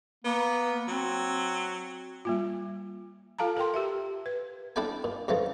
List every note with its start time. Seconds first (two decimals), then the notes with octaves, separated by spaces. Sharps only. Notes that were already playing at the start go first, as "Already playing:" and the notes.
0.24 A#3 B3
0.88 F#3 C4
2.25 G3 A#3 F4
3.39 F4 A4 F5 A5 A#5
3.57 A4 A#4 G5 C6
3.74 G4 A#4 E5
4.26 B4
4.76 D4 E4 A4 D5 G5 G#5
5.04 A#2
5.28 F2 C#3 E3 F3 A3